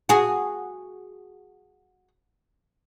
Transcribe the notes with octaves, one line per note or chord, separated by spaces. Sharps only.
F#4 G#4